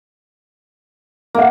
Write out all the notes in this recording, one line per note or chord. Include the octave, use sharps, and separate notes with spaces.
A#3 A#4 E5 F#5